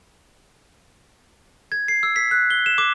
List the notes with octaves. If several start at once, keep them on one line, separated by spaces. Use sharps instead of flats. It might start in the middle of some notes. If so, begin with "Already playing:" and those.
G#6
C7
E6
B6
F#6
G7
E7
D6